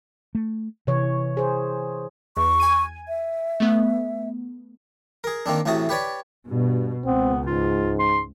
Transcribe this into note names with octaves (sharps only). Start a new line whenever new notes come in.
A3
C3 E3 C#5
G#4 C5
E2 C#6
G#5 G#6 D#7
E5
A3 B3
G#4 A#4
D#3 A#3 C4 D4
A1 A2 C3 F#4 A5 D#6
G4 B4 C#5 D5
G2 B2
C#2 B3 C4
G#2 F4
C6